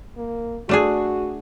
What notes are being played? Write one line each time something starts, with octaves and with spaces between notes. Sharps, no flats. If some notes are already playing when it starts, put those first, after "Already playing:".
A#3
A3 D4 F#4 G#4